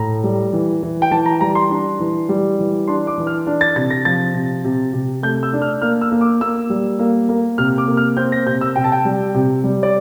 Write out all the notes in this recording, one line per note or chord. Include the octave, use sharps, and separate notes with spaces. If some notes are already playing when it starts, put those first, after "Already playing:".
Already playing: A2 A#5
G3
E3
E3
G5
E3 A5
A#5
G3 A#5
C6
D4
E3
G3
E3
D4 C6
D6
E3
F6
D4
A6
C3 A6
A#6
F3 A6
C3
C3
C3
A3 G6
E6
D4
F6
A#3 F6
E6
A#3
D6
A#3 E6
G3
A#3
A#3
C3 F6
D6
A#3
F6
C4 G6
A#6
C3 G6
E6
C3 G5
A5
G5
G3
C3
G3
D5